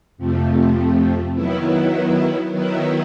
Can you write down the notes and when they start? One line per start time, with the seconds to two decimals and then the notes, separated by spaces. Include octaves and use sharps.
0.17 F2 C3 F3 A3
1.34 D#3 F#3 B3 E4
2.51 D#3 F#3 B3 E4